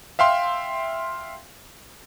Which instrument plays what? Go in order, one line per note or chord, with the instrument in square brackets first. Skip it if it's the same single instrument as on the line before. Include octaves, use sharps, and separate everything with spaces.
[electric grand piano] E5 F5 G5 C6